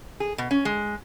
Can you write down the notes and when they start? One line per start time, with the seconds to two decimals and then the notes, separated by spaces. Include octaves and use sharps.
0.20 G#4
0.38 B2
0.51 C#4
0.65 G#3